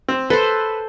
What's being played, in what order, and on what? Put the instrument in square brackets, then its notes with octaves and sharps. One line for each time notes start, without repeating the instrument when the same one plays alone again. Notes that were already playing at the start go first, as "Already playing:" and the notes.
[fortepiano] C4
[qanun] A4 C5 [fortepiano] B4